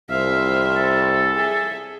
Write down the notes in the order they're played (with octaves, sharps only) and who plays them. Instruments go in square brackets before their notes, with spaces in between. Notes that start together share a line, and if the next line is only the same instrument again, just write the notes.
[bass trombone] C2 [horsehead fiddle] C5 E5 [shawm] F5
[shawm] A4
[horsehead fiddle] G#4 E5